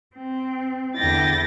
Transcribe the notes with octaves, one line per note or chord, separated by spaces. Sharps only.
C4
E2 D3 E4 G5 A6 A#6